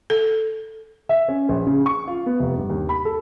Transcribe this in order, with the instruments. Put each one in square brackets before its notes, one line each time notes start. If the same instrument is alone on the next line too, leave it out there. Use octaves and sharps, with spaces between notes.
[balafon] A4
[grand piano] E5
C#4
A#1
C#3
C#6
F4
B3
F1
G2
D#2
B5
A4